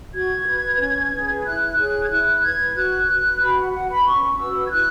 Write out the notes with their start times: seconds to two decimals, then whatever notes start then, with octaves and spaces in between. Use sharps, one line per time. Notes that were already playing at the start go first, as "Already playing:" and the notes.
0.14 F#4 G#6
0.47 B4
0.80 C#4
1.12 G#4 B4
1.44 E4 F#6
1.77 G#4 C#5 F#6
2.03 G#6
2.10 E4 F#6
2.43 B4 G#6
2.75 F#4 F#6
3.08 B4 F#6
3.41 F#4 B5
3.57 F#5
3.73 B4 F#5
3.90 B5
4.05 C#4 C#6
4.38 F#4 B4 E6
4.67 G#6
4.71 E4 F#6